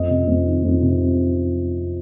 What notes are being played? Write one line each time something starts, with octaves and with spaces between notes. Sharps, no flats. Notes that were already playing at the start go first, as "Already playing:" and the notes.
Already playing: F2 D#5
C3
F2
D#3
F2
C3